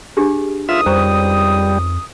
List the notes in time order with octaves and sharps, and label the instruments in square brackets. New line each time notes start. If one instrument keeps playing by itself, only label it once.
[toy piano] D4 G4 G#4
[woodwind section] C#2 D#3 D#6 [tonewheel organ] F4 E5
[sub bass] F2 [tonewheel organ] G3 [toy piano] C5 A#5 C#6